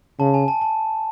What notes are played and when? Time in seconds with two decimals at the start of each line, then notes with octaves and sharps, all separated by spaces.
0.20 C#3 A5
0.34 G#5
0.48 A5
0.61 A5